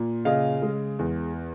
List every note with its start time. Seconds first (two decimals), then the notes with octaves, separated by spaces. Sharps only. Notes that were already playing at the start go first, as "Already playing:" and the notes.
Already playing: A#2
0.25 C#3 D#5 F5
0.62 G#3
0.99 E2